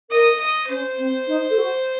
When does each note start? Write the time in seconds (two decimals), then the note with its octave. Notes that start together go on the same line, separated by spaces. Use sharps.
0.10 A#4 D#5
0.39 D#5
0.68 C#4 C5
0.98 C4
1.27 D#4
1.50 A4
1.56 F#4